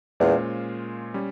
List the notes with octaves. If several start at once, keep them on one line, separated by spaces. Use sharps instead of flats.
E2 A#2 G#3 C#4 F4 C5
G3 C#4